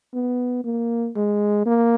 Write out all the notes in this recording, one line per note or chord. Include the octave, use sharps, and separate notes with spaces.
B3
A#3
G#3
A#3